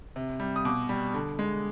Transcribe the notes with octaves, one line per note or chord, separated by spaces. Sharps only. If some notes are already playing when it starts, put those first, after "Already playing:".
C3
G3
D#6
B2 D6
G3
D3
G#3